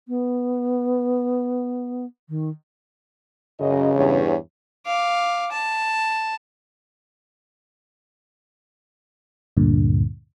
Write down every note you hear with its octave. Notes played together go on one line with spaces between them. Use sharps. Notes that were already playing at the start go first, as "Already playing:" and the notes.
B3
D#3
F#2 C#3 D#5
E2 G2 C#5
F5 D6
A5
D2 G2 A#2 D3